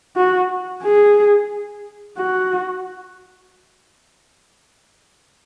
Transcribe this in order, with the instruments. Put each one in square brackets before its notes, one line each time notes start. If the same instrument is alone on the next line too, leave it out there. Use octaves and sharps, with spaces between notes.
[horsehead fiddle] F#4
G#4
F#4